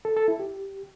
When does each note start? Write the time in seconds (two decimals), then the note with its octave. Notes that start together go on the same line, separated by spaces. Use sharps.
0.05 A4
0.16 A4
0.28 E4
0.39 G4